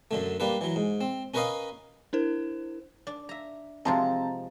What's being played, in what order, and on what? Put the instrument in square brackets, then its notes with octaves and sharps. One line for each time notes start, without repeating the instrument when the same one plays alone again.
[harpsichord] F#2 D3 A3
G3 A#3 D4 B4
E3 F#3
G#2
C4
C#4 A#4 B4 C#5 D#5 F5
[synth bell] D4 E4 A#4 C5
[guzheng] D4
E5 A#5
[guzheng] C3 F3 G#3 [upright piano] C4 A5 A#5